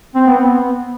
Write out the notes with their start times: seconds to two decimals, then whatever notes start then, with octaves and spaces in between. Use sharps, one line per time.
0.15 C4
0.27 B3
0.38 B3